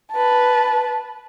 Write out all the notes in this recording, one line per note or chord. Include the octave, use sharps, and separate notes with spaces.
B4 A5